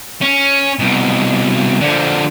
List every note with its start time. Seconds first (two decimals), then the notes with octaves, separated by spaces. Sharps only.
0.21 C#4
0.79 C2 B2
1.80 D3 F3